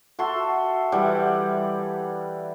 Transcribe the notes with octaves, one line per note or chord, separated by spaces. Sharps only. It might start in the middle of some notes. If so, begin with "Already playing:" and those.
F#4 A4 E5 C6
E3 G3 F#5 G5